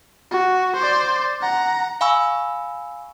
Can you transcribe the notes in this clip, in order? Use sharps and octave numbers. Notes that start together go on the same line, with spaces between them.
F#4
C5 D5
F#5 A#5
F5 G#5 B5 C#6 E6